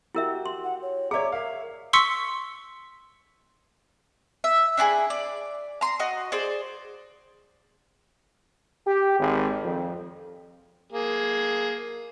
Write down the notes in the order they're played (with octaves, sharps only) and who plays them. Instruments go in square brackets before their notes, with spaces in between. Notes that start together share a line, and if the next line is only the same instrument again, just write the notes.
[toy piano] E4 A#4 E5 [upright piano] F#4 G4
[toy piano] C6
[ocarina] F#5
C#5
[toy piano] G#4 D5 [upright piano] C#5 E5 D6 [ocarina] A#5
[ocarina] A#4 [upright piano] E5 F5
[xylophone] C6 C#6 E6 B6 C#7
[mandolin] E5
D4 E4 F#4 G#4
D5
A#5 C6
F#4 D#5
G#4 C5 D5
[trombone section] G4
G#1
F2
[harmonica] A#3 G#4